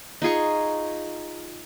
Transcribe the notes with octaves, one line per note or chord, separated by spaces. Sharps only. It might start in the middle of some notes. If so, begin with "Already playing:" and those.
D#4 F4 G#4 C#6